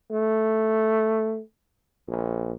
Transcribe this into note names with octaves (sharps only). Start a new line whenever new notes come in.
A3
A#1